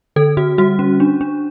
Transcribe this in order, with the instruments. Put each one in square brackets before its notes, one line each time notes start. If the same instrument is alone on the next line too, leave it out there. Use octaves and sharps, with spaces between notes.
[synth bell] D3 A4
D3 F#4
G3 F#4
C#4
D4
D4